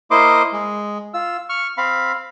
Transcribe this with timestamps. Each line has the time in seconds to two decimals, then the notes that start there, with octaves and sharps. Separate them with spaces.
0.11 A#3 E4 C5 D#5 C6 D6
0.53 G#3
1.14 F4 E6
1.49 C#6 F6
1.77 C4 F5 B5